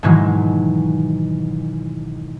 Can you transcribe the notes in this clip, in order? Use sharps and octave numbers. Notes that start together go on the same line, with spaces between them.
G#2 B2 D#3 E3 F#3 G#3